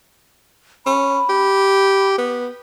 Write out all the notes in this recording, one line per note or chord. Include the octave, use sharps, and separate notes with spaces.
C#4 B5
G4
B3